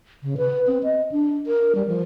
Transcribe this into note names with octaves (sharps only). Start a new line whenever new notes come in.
C#3
B4
C4
D#5
D4
A#4
G3
F3